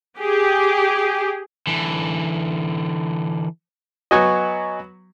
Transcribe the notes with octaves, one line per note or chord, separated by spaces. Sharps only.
G4 G#4
D3 E3
F#3 B3 F#4 D#5 G#5 C#6